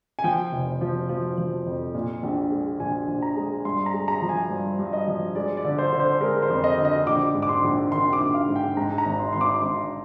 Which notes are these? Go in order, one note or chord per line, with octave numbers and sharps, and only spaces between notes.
G#5
F3 G5
F1
F3
F3
F3
F2
A#2
A#1
G#3
A#1 G#5
A#1
A#5
G#3
G2 C6
A#5
G#3
A#5
F3
G#5
G2
G2
D#5
F3
G#3 D5
D5
D3
C5
D3
C5
G#3 A#4
C5
F2
D#5
D3
D#5
A#1 D6
G#2
D6
C6
A#1
D#3 C6
D6
A#1
F5
G#2
G5
G#2 A#5
A#5
G#1
C6
G#1 C6
D6
G#1 C6